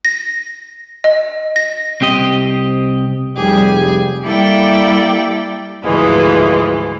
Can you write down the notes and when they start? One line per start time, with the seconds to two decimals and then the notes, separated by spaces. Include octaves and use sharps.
0.05 A#6
1.04 D#5
1.56 A#6
2.01 C2 C4 G4 D#5
3.36 F1 G3 G4 G#4
4.23 G3 A#3 E4 A4 D5 G5
5.82 D2 G#2 E3 F3 G#3